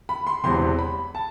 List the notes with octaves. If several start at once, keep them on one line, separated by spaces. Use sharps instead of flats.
B5
C6
E1 E2 C3 C6
B5
A5